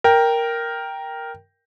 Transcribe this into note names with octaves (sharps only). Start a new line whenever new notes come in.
A#4 G5